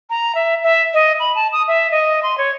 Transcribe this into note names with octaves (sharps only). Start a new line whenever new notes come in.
A#5
E5
E5
D#5
B5
A5
D#6
E5
D#5
C6
C#5